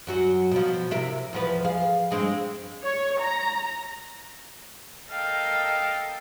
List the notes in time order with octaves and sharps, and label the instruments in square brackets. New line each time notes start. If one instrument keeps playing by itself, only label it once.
[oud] F#2 F#3 F#4
B2 F3
C3 E4 A#4
E2 F3 B4
G#4 F5
G2 G#3 C4
[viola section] C#5
A#5
[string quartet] A4 A#4 D#5 F5 G5 A5